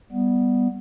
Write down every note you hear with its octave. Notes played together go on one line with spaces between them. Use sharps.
G3 B3